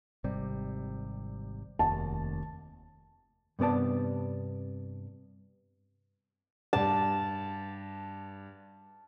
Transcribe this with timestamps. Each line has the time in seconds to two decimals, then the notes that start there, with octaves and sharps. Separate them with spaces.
0.24 G#1 C3 G3
1.79 F1 D#2 A5
3.59 G2 C3 B3 D5 A5
6.73 G2 D5 A5